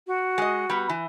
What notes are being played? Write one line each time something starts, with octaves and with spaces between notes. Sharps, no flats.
F#4
G#3 D#5
G3 B3
E3